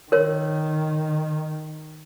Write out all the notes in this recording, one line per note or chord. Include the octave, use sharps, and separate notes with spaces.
D#3 A#4 C#5